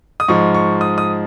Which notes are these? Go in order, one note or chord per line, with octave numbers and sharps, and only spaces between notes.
D#6
G#2 F3 G#3 C#6
C#6
D#6
D#6